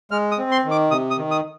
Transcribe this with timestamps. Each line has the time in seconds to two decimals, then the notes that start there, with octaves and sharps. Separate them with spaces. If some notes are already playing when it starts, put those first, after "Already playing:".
0.11 G#3 F6
0.31 D#6
0.38 C4
0.51 C6
0.65 D#3
0.71 D6
0.91 C3 D#6
1.11 D#6
1.18 D#3
1.31 D#6